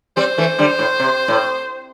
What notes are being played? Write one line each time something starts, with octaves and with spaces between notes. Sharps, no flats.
G3 C4 C5
E3 A3
D3 G3
A2
C3
A2